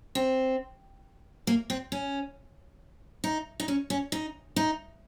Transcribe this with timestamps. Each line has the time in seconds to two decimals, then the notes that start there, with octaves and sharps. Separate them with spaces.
0.15 C4
1.47 A#3
1.70 C4
1.92 C#4
3.24 D#4
3.60 D#4
3.68 C#4
3.90 C#4
4.12 D#4
4.56 D#4